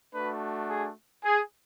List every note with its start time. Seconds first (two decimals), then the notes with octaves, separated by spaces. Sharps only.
0.14 A3 D4 F#4 B4
0.69 G#4
1.24 G#4